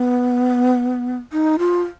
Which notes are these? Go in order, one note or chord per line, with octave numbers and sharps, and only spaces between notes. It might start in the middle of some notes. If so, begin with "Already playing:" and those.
Already playing: B3
D#4
F4